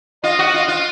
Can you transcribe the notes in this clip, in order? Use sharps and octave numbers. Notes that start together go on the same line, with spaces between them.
F4 D#5
F#4
F4
F4